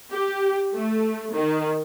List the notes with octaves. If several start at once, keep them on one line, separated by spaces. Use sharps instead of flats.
G4
A3
D#3